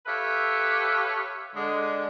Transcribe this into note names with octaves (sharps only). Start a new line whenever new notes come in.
G4 A4 B4 C#5 E5 F5
D3 G#3